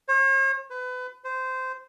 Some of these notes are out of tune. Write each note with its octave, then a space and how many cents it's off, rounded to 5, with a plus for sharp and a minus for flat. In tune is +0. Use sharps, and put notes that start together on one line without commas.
C#5 -45
B4 +30
C5 -15